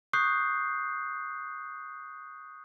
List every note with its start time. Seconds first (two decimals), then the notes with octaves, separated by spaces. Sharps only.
0.13 C#6 D#6 F#6 G6 C7